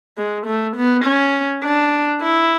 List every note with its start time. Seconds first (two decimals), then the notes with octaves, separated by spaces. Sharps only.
0.17 G#3
0.46 A3
0.76 B3
1.04 C#4
1.63 D4
2.22 E4